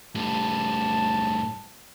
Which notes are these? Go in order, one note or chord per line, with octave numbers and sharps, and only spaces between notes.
A2 G3 A5